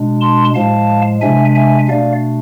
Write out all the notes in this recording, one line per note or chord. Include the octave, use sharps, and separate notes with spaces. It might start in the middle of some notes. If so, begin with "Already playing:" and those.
Already playing: B2 G#3 D4
A5 C6
A2 F3 G#3 F5 A5
C3 G#3 D4 E5 G#5
E5 G#5
B2 A3 D4 D5 F5